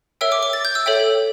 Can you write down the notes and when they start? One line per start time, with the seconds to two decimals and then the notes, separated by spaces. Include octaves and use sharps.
0.21 A#4 C#5 E5 G5 E6
0.32 D6
0.43 D6
0.53 A6
0.65 G6
0.75 E6
0.86 A4 C#5 E5 G5